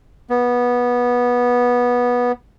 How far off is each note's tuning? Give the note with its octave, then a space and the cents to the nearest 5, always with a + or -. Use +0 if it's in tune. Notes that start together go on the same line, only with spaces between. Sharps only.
B3 -15